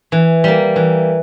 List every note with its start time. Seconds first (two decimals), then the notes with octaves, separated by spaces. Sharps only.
0.12 E3
0.44 G3 A#3
0.76 E3